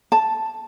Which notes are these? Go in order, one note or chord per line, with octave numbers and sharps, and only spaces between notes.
A5